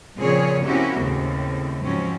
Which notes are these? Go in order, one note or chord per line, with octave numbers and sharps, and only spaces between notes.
A#2 C#3 F3 C4 G#4 C#5
A#3 C4 C#4 E4 F#4 G4
D#2 A2 C#3 C4
G#2 F3 F#3 C4 C#4